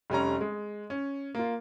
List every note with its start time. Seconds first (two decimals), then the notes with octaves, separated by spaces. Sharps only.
0.10 F1 G3 C#4 A#5
0.41 G#3
0.90 C#4
1.35 A#3 F4